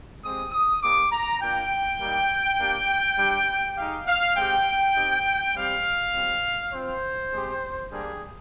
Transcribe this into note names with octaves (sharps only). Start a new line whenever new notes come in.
G#3 C4 G4 D#6
D#6
A#3 D4 G4 D6
A#5
A#3 D4 F4 G5
G3 A#3 D#4
A#3 D4 G4
G3 D4 G4
G#3 D#4 G4 F5
F5
G#3 C4 G4 G5
C4 D#4 G4
G3 C4 G4 F5
G3 C4 F4
C4 F4 C5
G#3 C4 G4
G3 A#3 D4 G4 G#4